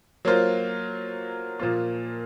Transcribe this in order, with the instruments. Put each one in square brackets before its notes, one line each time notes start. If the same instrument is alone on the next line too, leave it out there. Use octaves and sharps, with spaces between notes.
[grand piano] F#3 A#3 F4 C5
A#2 F3 A#3 F4